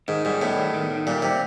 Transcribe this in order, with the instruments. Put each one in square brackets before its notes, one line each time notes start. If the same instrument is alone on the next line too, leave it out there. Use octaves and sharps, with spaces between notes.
[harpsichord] G#2 [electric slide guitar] D#3
[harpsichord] G#2 [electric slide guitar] G3
[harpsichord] A2 [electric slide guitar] B3
[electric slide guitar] D#3
D#3
D#3
[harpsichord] A#2 [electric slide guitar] G3
[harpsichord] C3 [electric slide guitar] G3